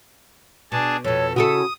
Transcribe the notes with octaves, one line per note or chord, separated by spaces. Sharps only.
B2 D4 G#4 A5
F2 B2 A4 C#5
C#3 C#4 E4 F#4 A4 D#6